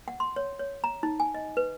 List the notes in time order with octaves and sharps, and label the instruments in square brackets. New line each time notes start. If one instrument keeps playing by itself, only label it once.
[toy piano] F#5
C6
C#5
C#5
A#5
D#4
G#5
D#5
B4